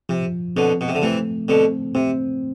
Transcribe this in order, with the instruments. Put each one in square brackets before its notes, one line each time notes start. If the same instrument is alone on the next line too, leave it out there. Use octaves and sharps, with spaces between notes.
[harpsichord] C3 [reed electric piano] F3
[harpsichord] B2 D3 [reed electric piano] C4
[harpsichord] B2
C3
D3
[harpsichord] C3 E3 [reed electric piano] A3
[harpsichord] B2 D3 [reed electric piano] C4
[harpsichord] C3 [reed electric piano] C4